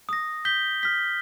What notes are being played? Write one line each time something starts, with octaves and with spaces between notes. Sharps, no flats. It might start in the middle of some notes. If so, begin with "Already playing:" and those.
D#6 A#6
G6 B6 G7
F6 B6